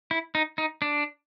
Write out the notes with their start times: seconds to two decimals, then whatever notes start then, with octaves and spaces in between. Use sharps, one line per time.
0.11 E4
0.35 D#4
0.58 D#4
0.82 D4